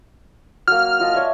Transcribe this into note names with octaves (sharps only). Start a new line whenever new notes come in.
F#3 A#3 F6
F4 D#5 A5
C#5 D5 E5